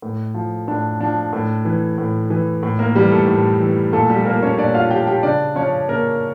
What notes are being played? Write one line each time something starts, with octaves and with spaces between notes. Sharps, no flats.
A2
F3
A2 D4
F3 D4
A2
E3
A2
E3
A2
A#3 A#4
E3 G3 G4
A3 A4
A2
E3
A#2 A3 A4
G3 G4
F3 A#3 A#4
C#4 C#5
A#2 D4 D5
F4 F5
F3 G4 G5
G4 G5
C#3 D4 D5
F3 C#4 C#5
C#3 A#3 A#4